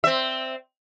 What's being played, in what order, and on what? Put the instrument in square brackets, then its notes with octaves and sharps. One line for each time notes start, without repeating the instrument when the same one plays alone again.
[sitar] C4 E5